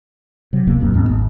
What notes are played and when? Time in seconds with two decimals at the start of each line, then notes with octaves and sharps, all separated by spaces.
0.53 C3 F#3
0.67 E1 C#2 C3 A#3
0.80 D1 F#2 A#2 C4
0.94 D#2 G#2 B3 C#4
1.09 G#1